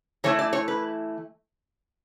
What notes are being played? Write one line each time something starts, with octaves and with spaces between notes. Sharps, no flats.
E3 A3 E4 C#5
D5
C#5
B4